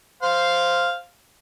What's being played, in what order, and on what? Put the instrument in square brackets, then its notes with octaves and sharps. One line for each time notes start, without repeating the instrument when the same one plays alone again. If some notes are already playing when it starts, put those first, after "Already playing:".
[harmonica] C5 F5